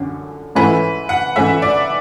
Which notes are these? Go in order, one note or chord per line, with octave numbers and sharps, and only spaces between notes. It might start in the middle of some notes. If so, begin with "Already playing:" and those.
Already playing: F#2 D3 C#4
G#2 E3 A3 C#4 E4 B4
F#5
G#2 E3 A3 C#4 E4 E5
D5